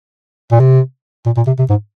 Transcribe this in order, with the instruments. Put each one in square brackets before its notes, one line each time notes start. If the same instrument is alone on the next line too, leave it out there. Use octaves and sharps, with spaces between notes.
[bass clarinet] A#2
C3
A#2
A#2
C3
C3
G#2